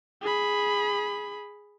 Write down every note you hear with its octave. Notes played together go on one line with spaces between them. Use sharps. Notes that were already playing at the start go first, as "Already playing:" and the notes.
G#4 B5